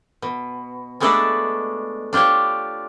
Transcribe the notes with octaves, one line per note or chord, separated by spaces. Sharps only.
B2
B2 G#3 A3 D4 A4 B4
D4 F4 G4 C5 C#5